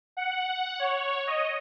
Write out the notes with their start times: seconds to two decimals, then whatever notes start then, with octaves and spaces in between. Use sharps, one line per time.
0.17 F#5
0.79 C#5
1.27 D#5